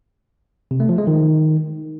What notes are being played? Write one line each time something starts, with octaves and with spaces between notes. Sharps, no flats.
C3
A3
F3
G#3
D#3